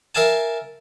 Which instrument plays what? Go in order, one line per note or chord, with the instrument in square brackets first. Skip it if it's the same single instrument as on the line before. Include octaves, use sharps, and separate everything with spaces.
[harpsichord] A#4 E5 F5 G#5 A5